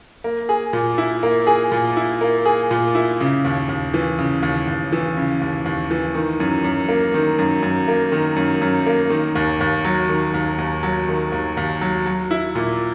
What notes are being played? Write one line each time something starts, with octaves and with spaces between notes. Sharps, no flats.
A#3
G#4
A#2
E4
A#3
G#4
A#2
E4
A#3
G#4
A#2
E4
C#3
D#2
D#2
E3
C#3
D#2
D#2
E3
C#3
D#2
D#2
E3
D#3
F#2
F#2
A#3
D#3
F#2
F#2
A#3
D#3
F#2
F#2
A#3
D#3
D#2
D#2
F#3
D#3
D#2
D#2
F#3
D#3
D#2
D#2
F#3
F#3
E4
A#2